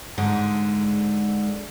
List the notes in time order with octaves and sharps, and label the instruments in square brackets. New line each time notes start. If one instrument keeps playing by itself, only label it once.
[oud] G#2 D3